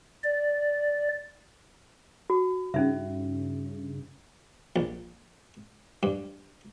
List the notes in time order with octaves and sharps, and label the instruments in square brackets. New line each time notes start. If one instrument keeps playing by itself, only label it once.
[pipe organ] D5
[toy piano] F#4
[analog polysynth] G2 C#3 [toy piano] C#4 D#4 E5
[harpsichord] A#1
G2